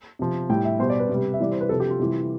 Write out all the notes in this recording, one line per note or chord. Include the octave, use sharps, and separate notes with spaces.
C3 F3
A2 G3 G5
E5
B2 G3 C5
D5
B4
C3 G3
E5
C3 E3 G3 D5
C5
B4
C3 F3 A4
G4
F4
C3 E3 G3